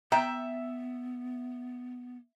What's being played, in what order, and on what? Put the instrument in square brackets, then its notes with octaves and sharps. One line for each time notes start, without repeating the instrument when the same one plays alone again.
[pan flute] B3 [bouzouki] E5 [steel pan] G5 [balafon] A#5